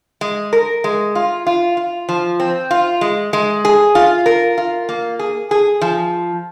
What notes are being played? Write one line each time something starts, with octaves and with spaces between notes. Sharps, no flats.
G#3
A#4
G#3
F4
F4
F4
F3
C4
F4
G#3
G#3
G#4
F4
A#4
F4
A#3
G#4
G#4
F3